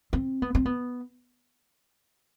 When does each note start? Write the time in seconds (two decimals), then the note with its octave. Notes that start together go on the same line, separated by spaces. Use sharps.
0.13 C4
0.42 B3
0.55 C4
0.66 B3